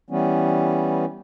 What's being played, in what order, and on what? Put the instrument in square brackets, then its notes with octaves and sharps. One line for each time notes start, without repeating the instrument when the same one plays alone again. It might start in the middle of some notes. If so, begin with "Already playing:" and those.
[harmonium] E3 G3 B3 C#4